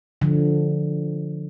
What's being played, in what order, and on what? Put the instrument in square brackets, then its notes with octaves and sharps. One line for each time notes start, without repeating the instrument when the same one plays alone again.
[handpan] D3 F3